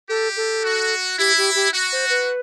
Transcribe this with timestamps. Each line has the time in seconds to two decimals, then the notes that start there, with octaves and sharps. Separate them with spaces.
0.09 G4 A4
0.37 A4
0.64 F#4
1.18 E4 G4
1.37 G4
1.55 G4
1.73 F#4
1.92 C5
2.10 B4